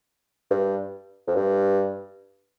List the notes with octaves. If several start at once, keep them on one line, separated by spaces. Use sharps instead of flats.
G2
F2
G2